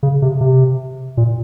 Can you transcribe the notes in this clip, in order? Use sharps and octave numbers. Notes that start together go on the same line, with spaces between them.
C#3
C3
C3
A#2